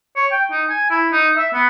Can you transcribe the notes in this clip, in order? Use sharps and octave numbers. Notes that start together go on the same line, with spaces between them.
C#5
G5
D#4
G#5
E4
D#4
E5
B3